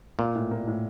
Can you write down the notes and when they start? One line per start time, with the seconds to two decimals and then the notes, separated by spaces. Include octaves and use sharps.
0.19 A#2 A#3
0.35 A2
0.51 A#3
0.67 A2